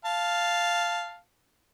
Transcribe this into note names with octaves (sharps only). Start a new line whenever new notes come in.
F5 A5